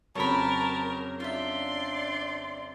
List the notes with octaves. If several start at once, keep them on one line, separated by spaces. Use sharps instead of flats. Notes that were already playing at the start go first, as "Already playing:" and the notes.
F2 C#3 F#3 A#4 C#5 A5 B5
D4 F4 D5 E5 C6